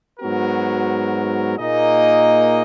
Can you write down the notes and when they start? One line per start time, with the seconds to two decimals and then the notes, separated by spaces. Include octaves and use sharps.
0.20 G#2 F#3 B3 F#4 A#4
1.57 A#2 A#3 D#4 G#4 D#5